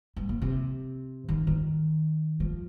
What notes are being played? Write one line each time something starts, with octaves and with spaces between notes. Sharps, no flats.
G2
A#2
C3
D#3
D#3
F3